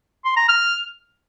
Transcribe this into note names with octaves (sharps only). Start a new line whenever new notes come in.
C6
A#5
F6